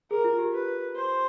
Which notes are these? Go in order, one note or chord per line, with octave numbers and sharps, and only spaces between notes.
G#4 A#4
F4
G4
B4
C5